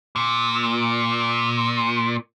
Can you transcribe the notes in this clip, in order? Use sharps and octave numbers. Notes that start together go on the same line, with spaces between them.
A#2